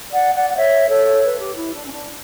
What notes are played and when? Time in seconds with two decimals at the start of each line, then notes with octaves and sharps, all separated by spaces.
0.12 D5 F#5
0.34 D5 F#5
0.51 F#5
0.57 C#5 E5
0.90 A4 C#5
1.23 B4
1.40 G4
1.57 E4
1.74 D4
1.86 C#4
1.91 D4